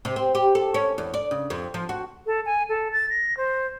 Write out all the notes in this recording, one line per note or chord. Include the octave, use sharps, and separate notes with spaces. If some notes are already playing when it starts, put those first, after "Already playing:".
C3
C4
G4
A4
C#4
E2
D5
C#3
F2
F3
F#4
A4
G#5
A4
A6
A#6
C5